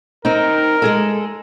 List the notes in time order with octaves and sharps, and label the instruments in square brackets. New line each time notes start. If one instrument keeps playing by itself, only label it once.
[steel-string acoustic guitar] C4 D#4 [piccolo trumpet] A#4
[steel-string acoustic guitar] G#3 G#4 A4